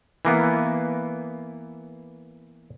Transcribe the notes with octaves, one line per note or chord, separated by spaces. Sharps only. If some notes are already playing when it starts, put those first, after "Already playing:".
E3 A#3 B3